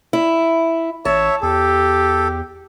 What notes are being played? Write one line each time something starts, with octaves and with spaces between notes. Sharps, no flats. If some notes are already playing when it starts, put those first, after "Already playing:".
E4
A1 C#5 E5 A5
E2 G4 A4